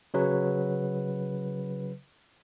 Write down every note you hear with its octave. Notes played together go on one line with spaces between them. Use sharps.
C#3 F#3 B4